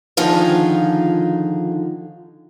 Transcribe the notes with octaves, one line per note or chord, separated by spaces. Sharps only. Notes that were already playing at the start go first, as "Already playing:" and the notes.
D3 D#3 F3 D#4 F4 G#4